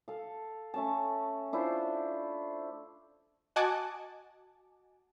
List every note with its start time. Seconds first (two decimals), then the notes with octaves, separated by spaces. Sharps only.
0.08 A4 F5
0.74 A3 C#4 A5
1.53 D4 E4 F4 C5
3.56 F#4 D#5 F#5 G#5 A5 D6